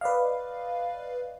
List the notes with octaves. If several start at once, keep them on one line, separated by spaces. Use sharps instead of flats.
B4 D5 D#5 F5